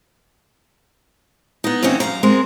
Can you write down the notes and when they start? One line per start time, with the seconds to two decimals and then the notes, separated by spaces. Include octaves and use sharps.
1.64 B3 D#4
1.82 E3 A#3 C4 C#4 D#4
2.00 F#2 F3 F5 A#5
2.23 G#3 C4 A#4